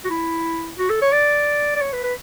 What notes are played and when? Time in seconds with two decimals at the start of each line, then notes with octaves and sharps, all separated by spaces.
0.05 F#4
0.10 E4
0.78 F#4
0.90 A4
1.02 C#5
1.12 D5
1.76 D5
1.81 C#5
1.93 B4
2.03 B4